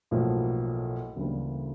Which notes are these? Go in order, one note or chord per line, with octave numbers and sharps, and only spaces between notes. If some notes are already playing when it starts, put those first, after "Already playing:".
B1 A2 F3 A#3
D2 C#3 E3 G3 A#3